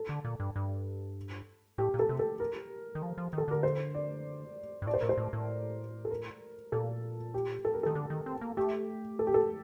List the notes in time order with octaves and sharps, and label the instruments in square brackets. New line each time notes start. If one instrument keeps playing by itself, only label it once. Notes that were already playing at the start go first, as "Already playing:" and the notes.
Already playing: [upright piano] A4
[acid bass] D3
A#2
G2
G2
[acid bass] A2 [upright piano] G4
[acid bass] A#2
[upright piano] A4
[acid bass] C3
[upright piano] A4
A#4
[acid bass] D#3
F3
F3
[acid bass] D#3 [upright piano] A4
[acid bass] D3 [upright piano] A#4
[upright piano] C5
D5
[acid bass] G2
[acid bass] A2 [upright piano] D5
[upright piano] C5
[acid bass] A2 [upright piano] A#4
[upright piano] C5
[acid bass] A2
A2
[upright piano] A4
A#4
[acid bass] A#2 [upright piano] A4
[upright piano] G4
A4
A#4
[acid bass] D#3 [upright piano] A4
[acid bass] D3
D#3
C4
A#3
[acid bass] A3 [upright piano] G4
[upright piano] A4
G4
A4